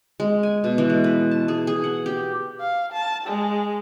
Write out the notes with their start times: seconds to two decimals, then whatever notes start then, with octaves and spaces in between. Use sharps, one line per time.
0.20 G#3
0.43 G#5
0.64 B2
0.78 E3
0.90 G#3
1.04 B4
1.31 A5
1.48 G#4
1.67 G#4
1.84 F#5
2.06 G4
2.61 F5
2.93 A5
3.27 G#3